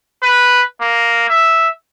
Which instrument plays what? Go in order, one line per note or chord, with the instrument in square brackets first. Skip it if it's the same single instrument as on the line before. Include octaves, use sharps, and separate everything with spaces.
[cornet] B4
A#3
E5